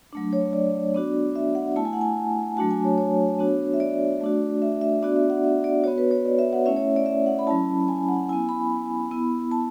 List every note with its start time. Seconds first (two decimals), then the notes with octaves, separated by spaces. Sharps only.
0.13 F#3 A3 D4
0.33 C#5
0.53 D5
0.95 B3 D4 F#4
1.36 E5
1.55 F#5
1.76 A3 E4 A5
1.85 G#5
1.93 F#5
2.01 G#5
2.57 F#3 A3 D4 F#4 A5
2.71 G#5
2.84 C#5
2.98 C#5
3.39 B3 D4 F#4
3.74 E5
3.80 D5
4.21 A3 D4 F#4
4.62 E5
4.81 E5
5.03 B3 D4 F#4 D5
5.16 E5
5.30 F#5
5.44 E5
5.64 D5
5.84 B3 F#4 C#5
5.98 B4
6.11 C#5
6.25 D5
6.39 E5
6.53 F#5
6.66 A3 C#4 E4 E5
6.76 C#5
6.96 D5
7.06 E5
7.26 F#5
7.39 B5
7.47 F#3 C#4 E4 A5
7.88 G#5
8.09 F#5
8.29 B3 E4 G#5
8.49 B5
9.11 B3 E4
9.51 A5